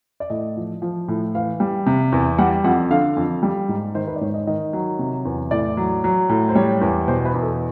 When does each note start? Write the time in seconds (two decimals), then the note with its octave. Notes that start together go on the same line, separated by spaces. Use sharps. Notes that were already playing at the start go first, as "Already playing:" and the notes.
0.20 D5
0.30 A2 D#5
0.57 F3
0.82 F3
1.08 A2
1.35 E3 F5
1.60 G3
1.86 C3
2.12 E2
2.38 G3 F#5
2.64 F2 F#5
2.90 D3 F5
3.17 F2
3.43 G3
3.69 G#2
3.95 D#3 C5
4.08 B4
4.16 D5
4.21 G#2 C#5
4.34 D#5
4.47 D#3 D#5
4.73 F#3
4.99 C3
5.25 E2
5.51 A2 D5
5.77 F#3
6.04 F#3
6.29 A2
6.49 C5
6.55 G3 C#5
6.81 E2
7.08 B2 C5
7.25 B4
7.34 E2
7.42 A4